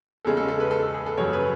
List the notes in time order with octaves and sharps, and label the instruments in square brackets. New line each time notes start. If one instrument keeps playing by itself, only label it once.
[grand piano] E2 C#3 G#3 A4
A4
A4
B4
A4
A4
G#4
A4
F#2 C#3 F#3 C#5
B4